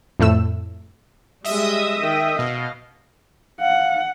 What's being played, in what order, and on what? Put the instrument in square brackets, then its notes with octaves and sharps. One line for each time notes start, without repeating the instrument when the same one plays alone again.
[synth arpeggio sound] F2 A2 A3 E6 E7
[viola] G3 G#3 [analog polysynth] D#5 E5 D#6
[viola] D#3 G5
[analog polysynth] B2 [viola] D#5 F5
[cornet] F5 [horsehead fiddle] F#5